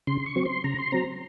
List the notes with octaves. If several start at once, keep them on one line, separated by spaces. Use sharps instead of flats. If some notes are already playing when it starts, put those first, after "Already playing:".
C#3 C6
C#6
F#3 C4
C6
C#3 A#5
C6
F#3 C4 A#5